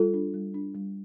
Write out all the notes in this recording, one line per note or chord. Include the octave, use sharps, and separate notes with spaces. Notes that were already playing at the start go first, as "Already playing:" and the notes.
Already playing: G3 F4 A4
D4
G3
D4
G3